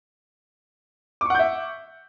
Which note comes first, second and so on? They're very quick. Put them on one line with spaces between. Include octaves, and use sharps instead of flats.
D6 C#6 F#5 G6 E5